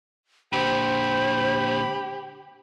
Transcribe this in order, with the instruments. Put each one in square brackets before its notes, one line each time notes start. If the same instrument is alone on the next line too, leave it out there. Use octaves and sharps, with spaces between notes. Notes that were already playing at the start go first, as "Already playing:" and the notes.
[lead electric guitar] A#2 D3 [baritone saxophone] G4 [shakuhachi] C5 [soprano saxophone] B5